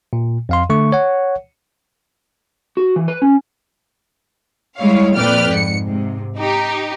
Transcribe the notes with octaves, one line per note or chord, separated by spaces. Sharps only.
A#2
F2 F5 C6
D3 A3 C#6
C#5 F#5
F#4
E3
B4
C#4
G3 G#3 E4 C#5 F5
F2 A#2 B4 D5 G5 F6
G#2 C#7
G#2 C3
D#4 G4